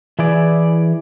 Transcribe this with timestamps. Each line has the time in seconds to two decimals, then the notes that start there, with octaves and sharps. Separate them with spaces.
0.19 E3 E4 G#4 D5